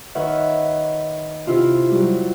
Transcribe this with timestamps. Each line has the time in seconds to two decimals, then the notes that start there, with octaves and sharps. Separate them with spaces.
0.15 D#3 B4 C#5 E5 F#5 F6
1.47 C3 E4 F4
1.91 F#3 G3